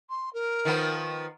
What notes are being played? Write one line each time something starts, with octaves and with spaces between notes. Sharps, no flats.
C6
A#4
D#3 F3 B3